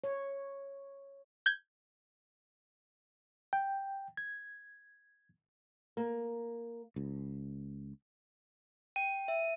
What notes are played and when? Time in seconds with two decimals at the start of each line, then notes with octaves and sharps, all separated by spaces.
0.04 C#5
1.46 G6 G#6
3.53 G5
4.17 G#6
5.97 A#3
6.96 C#2
8.96 G5 D#7
9.28 E5